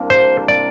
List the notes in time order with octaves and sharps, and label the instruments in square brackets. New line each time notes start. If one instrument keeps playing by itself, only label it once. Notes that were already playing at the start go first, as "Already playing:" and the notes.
Already playing: [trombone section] C2 C3 A#3 D4
[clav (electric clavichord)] C5
D5